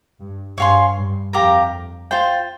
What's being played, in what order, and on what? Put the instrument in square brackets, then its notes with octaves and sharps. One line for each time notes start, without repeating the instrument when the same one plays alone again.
[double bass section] G2
[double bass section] G2 [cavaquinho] C#5 F5 G#5 C6
[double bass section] G2
[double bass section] F2 [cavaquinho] G4 A#4 F5 A#5
[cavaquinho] F4 C5 G5